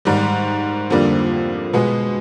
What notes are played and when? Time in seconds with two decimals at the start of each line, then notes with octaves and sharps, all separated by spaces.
0.05 G#2 D#3 G3
0.90 F2 D3 G3 A#3
1.73 B2 G#3 B3